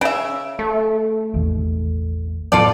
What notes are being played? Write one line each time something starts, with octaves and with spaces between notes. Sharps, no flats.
C#3 C#4 E5
A3
E1 A1 D#2
A2 F#3 B3 F4 A4 D5